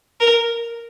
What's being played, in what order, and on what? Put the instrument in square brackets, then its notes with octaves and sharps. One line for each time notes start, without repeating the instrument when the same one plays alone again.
[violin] A#4